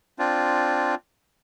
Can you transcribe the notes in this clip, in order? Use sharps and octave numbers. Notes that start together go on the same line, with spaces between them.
C4 D4 F4